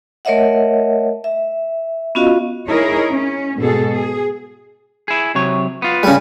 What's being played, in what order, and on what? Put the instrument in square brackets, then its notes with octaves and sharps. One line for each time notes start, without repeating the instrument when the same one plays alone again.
[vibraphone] A3 A#4 C#5 D#5 E5 F#5
E5
B3 C#4 F4 F#4 D#5 F5
[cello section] D#4 E4 G#4 A#4 C#5 D#5
C#4
G#2 B2 G#4 A4
G#4
[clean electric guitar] E4 G#4
C3 F#3 C#5
B3 F4
[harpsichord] C#3 G3